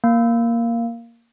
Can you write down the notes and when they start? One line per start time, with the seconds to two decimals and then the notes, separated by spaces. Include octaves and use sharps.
0.04 A#3